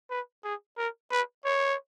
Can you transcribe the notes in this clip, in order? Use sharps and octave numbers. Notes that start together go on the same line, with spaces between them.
B4
G#4
A#4
B4
C#5